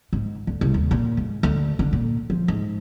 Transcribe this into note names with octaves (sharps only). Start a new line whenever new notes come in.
G#2
D2
C2
D#2
A#2
G#2
D2
D3
A#2
F3
G#2